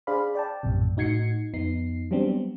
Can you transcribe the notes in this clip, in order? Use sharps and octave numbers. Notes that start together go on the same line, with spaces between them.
D4 G#4 C5 D5 F5 B5
D5 G5 A5
A#1 F#2 A2 C3
A2 D#4 F#4 G#6 C7 C#7
F2 B3 D#4 C7
F#3 G3 B3 C4 D4